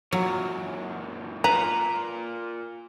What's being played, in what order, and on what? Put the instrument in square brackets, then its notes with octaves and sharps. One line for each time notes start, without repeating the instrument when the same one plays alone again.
[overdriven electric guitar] F#2 A#2 [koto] F#3
[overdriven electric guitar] A#2 [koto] B4 [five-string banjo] A#5